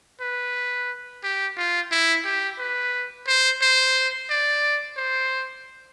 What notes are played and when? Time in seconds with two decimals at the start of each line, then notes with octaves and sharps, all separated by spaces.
0.21 B4
1.23 G4
1.57 F4
1.91 E4
2.25 G4
2.59 B4
3.27 C5
3.61 C5
4.30 D5
4.97 C5